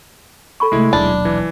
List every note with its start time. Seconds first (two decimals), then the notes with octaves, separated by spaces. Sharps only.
0.60 A4 B5 C#6
0.72 C3 G#3 A3 E4
0.93 D#1 B1 D4 B5
1.25 E3